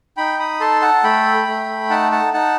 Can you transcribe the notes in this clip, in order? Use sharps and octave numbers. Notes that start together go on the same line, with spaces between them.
D#4 G5 B5
B5 D#6
A4 A5 C6
F#5 A5
A3 G5 B5
A3
D#4 F#5 A5
F#5 A5
D#4 F#5 A5